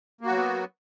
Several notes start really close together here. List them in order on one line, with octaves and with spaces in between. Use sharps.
A#3 F#4 F#3 B3